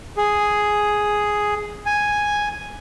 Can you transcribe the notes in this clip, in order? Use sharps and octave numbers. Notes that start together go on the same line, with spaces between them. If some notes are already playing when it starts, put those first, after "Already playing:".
G#4
G#5